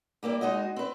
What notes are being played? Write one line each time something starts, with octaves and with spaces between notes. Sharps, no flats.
G3 A#3 E4 D5
G#3 D#4 F#4 D#5
C4 B4